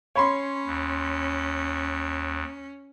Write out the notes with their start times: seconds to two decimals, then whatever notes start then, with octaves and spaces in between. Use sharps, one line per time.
0.15 C#4 C#5 B5 C6
0.66 D#2